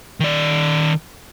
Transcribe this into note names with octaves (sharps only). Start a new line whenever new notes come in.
D#3 D5